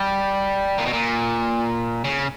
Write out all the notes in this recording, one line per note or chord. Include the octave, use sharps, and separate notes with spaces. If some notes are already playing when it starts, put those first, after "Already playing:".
Already playing: G3
A#2
B2
A#2
C#3